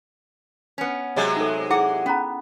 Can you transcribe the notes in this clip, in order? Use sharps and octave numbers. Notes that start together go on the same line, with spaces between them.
B3 C#4
C3 F#3 G#3
D#4 A4
E4 G#4 F#5 D6
B3 C#4 A#5